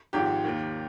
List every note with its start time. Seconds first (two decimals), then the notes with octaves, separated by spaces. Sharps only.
0.13 G#1 G#2 F3 G4
0.45 D#2 D#3